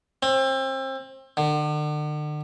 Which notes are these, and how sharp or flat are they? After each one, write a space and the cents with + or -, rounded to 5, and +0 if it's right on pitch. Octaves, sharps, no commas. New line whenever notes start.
C4 +30
D3 +40